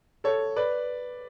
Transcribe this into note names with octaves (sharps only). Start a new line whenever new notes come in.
A4 C#5
B4 D5